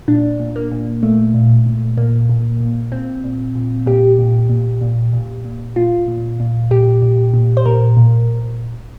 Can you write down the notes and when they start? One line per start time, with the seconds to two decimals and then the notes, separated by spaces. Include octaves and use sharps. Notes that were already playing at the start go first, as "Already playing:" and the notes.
0.08 A#2 D4
0.40 A#2
0.56 A#3
0.71 A#2
1.03 A#2 A3
1.34 A#2
1.66 A#2
1.97 A#2 A#3
2.29 A#2
2.61 A#2
2.92 A#2 C4
3.24 A#2
3.55 A#2
3.86 A#2 G4
4.18 A#2
4.49 A#2
4.81 A#2
5.13 A#2
5.45 A#2
5.76 A#2 F4
6.08 A#2
6.40 A#2
6.71 A#2 G4
7.02 A#2
7.34 A#2
7.57 C5
7.66 A#2 A#4
7.97 A#2